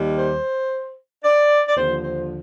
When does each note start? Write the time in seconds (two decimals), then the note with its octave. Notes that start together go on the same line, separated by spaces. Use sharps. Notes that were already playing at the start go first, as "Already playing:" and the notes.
Already playing: D#2 D#3 G3
0.18 C5
1.24 D5
1.67 D5
1.76 D#2 D3 F3 C5
2.03 C5